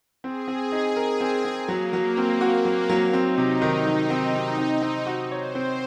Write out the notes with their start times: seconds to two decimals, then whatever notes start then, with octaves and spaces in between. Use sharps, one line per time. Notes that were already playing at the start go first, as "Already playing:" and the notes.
0.23 C4 G#4
0.48 C4
0.72 D#4
0.96 A#4
1.21 C4
1.45 C4
1.68 F#3 A#3
1.93 F#3
2.17 C4
2.41 F#4
2.65 F#3
2.89 F#3
3.13 C4 D#4
3.38 C3
3.62 D#3
3.86 F#3
4.10 C4
4.34 C3
4.58 C4
4.82 C4
5.06 F#4
5.31 C5 C#5
5.55 C4